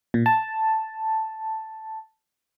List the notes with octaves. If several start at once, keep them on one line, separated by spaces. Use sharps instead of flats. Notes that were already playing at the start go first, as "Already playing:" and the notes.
A#2
A5